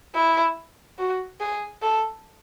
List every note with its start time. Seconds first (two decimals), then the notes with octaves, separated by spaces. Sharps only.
0.15 E4
0.99 F#4
1.40 G#4
1.82 A4